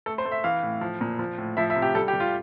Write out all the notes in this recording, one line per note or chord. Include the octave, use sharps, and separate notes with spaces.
A3 A4
C5
A3
E5
E3 F5
A2
F3
A#2
F3
A2
F3 E5
E5
C3
G4
G3 A4
G4
G3
F4